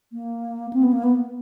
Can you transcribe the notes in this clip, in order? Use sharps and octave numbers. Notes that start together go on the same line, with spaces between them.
A#3
C4
B3
A#3
B3